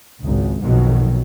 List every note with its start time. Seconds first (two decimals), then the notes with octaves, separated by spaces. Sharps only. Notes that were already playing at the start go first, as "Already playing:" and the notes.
0.23 G#1 C#2
0.63 B1 F2 B2 D#3 F#3